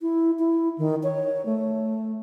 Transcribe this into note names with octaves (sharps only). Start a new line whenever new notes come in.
E4
E4
D#3
C#5
A3